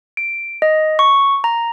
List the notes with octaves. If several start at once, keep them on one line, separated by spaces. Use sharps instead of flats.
D7
D#5
C#6
A#5